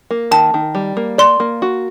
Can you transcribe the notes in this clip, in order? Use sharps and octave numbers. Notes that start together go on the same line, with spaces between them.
A#3
D#3 A5
D#3
G3
A#3
D5 C6
A#3
F#4